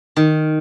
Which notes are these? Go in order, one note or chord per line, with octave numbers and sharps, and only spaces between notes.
D#3